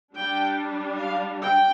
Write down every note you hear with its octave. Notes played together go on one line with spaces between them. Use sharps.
G3 D4 G5
F5
G5